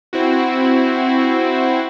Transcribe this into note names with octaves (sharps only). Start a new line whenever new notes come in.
C4 E4 F#4